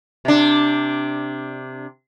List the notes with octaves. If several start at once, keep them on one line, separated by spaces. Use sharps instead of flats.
C3 D4